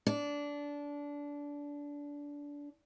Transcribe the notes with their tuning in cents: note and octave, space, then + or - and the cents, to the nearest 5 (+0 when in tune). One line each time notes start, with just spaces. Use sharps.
D4 -20